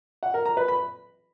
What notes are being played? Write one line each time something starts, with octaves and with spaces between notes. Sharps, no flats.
F#5
A#4
A#5
B4
B5